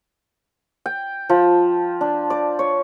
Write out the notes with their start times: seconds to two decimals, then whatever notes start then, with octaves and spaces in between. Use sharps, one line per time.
0.86 G5
1.30 F3
2.01 D4
2.30 D5
2.59 C#5